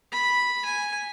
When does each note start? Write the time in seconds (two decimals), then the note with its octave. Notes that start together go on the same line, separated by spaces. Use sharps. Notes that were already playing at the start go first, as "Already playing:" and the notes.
0.12 B5
0.65 G#5